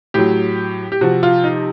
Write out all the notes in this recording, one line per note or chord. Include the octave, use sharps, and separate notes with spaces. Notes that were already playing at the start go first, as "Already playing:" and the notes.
A2 F#3 G4
G4
C3 F3 F#4
F4
D#4